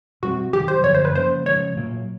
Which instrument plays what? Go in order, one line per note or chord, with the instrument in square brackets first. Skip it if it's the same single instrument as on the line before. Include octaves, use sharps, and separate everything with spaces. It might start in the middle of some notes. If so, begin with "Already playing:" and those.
[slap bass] B2 G3 C4 [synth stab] F#4
[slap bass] C3 D#3 F#3 [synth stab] G4
[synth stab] C5
[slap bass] F#2 D3 F3 [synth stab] C#5
[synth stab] C5
B4
[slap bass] C#3 F3 A#3 [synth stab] C5
[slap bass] C#3 F3 G#3 [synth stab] C#5
[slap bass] A#2 F#3 A#3